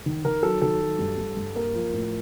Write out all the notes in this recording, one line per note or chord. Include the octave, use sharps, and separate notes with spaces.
D#3
D#3 A#4
F#3 A4
D#3 A4
F#3
G2
G2
G2
A#3 A#4
F3
A2